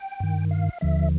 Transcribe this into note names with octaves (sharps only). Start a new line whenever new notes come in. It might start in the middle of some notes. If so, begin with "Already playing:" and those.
Already playing: G5
G2 D#3
F5
D#2 D3 F3 E5